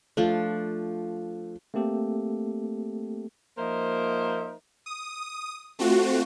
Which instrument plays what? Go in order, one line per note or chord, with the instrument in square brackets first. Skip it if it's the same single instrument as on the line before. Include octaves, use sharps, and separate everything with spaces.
[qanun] F3 D4 [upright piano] A3
[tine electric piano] A3 A#3 C4 G4 A4
[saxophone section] F3 A#3 D#4 A#4 C5 E5
[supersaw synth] D#6
A3 C4 F4 F#4